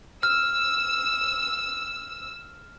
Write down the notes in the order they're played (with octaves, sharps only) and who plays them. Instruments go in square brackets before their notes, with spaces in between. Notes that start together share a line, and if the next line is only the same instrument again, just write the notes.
[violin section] E6 [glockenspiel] F6